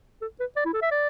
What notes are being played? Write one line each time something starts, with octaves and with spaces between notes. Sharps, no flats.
A4
B4
D5
E4
A4
E5
D5